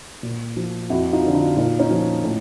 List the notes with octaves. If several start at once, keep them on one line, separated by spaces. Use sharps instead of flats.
A#2
F3
F2 E4 F#4
D#4 F4
D3 F3
D#4 F4
A#2 D#4 F4
C#4 D#4
F3
A2